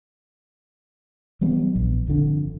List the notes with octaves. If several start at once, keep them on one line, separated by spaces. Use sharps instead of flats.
E3 F#3 G3 B3
A#1
G1 F2 D3